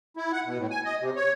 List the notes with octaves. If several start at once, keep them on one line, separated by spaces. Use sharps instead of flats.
E4
F#5
B2
A2
G#5
D#5
C3
C#5